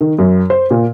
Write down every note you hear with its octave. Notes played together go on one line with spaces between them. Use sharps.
D#3
F#2
C5
A#2